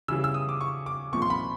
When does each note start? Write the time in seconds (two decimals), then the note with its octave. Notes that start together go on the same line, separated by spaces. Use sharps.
0.08 C#3 E3 G3 E6
0.24 E6
0.34 D#6
0.49 D6
0.61 C#6
0.86 D6
1.12 C2 A#2 F3 C#6
1.22 C6
1.30 B5